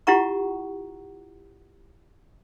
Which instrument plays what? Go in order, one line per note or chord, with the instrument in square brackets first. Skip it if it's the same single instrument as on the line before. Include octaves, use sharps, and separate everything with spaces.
[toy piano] E4 F4 G4 F#5 A#5 C#6